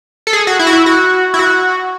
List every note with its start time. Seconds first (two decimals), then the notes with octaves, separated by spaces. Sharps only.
0.27 A4
0.33 G#4
0.47 F#4
0.59 E4
0.67 F#4
0.73 E4
0.86 F#4
1.34 E4
1.39 F#4